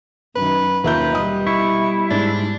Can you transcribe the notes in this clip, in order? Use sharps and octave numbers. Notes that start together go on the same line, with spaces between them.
F#2 D#3 B4
D#2 C#4 F4 A#4 B4 E5 G6
B2 G3 D#5 D#6
E4 C#6
G#2 D4